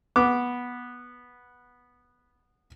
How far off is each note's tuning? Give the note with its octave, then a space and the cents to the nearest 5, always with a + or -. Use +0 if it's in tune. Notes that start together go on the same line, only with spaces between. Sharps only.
B3 -10 D6 +0